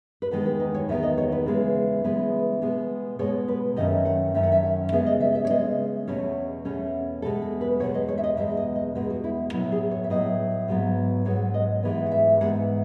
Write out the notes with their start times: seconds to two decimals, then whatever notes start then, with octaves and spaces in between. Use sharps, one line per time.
0.22 B4
0.31 E2 D#3 G#3 B3 A4
0.46 B4
0.60 D#4
0.74 C#5
0.89 E2 D#3 G#3 B3 E5
1.03 D#5
1.18 C#5
1.32 B4
1.46 C#3 E3 G#3 B3
2.04 C#3 E3 G#3 B3 B4
2.62 B2 G#3 B3
3.19 B2 G#3 B3 C#5
3.48 B4
3.76 F#2 D#3 A3 C#4 D#5
4.05 F#5
4.34 F#2 D#3 A3 C#4 E5
4.43 F#5
4.52 E5
4.63 F#5
4.92 C#3 G#3 B3 E5
5.06 D#5
5.20 E5
5.35 E5
5.45 C#5
5.50 C#3 G#3 B3 D#5
6.07 E2 B2 A3 C#4 C#5
6.65 E2 B2 A3 C#4
7.22 E2 B2 G#3 A4
7.42 A4
7.61 B4
7.80 E2 B2 G#3 C#5
7.94 D#5
8.08 C#5
8.18 E5
8.24 D#5
8.37 E2 B2 G#3 E5
8.57 D#5
8.76 D#5
8.95 E2 B2 G#3 B4
9.10 F#4
9.24 E4
9.53 A2 F#3 B3 E4
9.72 G#4
9.91 C#5
10.04 E5
10.10 A2 F#3 B3 D#5
10.68 G#2 F#3 B3
11.25 G#2 F#3 B3 C#5
11.54 D#5
11.83 G#2 E3 G#3 B3
12.06 F#5
12.11 E5
12.41 G#2 E3 G#3 B3 F#5